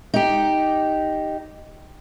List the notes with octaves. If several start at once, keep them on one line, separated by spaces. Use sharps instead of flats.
D#4 G4